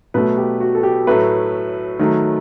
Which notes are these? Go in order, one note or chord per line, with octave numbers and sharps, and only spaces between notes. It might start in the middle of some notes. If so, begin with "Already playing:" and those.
B2 F#3 A3 B4
G4
F#4
A4
G4
A2 F#3 A3 B4
D#3 F#3 A3